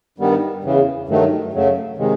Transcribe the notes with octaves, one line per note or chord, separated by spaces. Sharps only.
G2 D#3 G3 B3
E2 C#3 E3
G2 D#3 F#3 A3
F#2 C#3 F#3 A3
C3 D#3 G#3